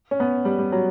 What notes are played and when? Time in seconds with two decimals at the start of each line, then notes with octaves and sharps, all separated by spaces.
0.11 C#4
0.20 B3
0.45 G3
0.58 G3
0.72 F#3